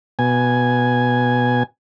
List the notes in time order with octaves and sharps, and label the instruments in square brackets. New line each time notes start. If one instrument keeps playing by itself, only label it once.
[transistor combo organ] B2 G#5